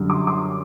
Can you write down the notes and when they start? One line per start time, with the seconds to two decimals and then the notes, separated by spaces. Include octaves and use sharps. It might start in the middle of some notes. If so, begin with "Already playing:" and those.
Already playing: F#2 D3 G3
0.10 C6 D6
0.27 C6 D6